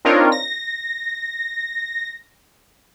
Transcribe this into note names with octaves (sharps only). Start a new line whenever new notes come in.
C4 D4 D#4 F4 A#4 C#5
A#6